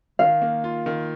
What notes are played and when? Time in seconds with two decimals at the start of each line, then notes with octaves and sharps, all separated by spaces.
0.19 D#3 F5
0.42 A#3
0.64 F4
0.86 D#3